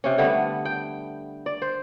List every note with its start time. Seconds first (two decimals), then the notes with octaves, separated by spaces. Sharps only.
0.04 C3 C#4
0.18 D3 G3 A3 B3
0.65 G5
1.46 D5
1.62 C5